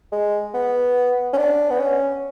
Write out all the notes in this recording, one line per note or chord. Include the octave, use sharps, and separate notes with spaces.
G#3
B3
C#4
D4
B3
C#4